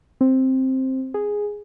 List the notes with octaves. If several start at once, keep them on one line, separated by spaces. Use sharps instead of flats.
C4
G#4